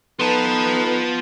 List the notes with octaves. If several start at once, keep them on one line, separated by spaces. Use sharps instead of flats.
B3 D#4 F4 A4 B4 A5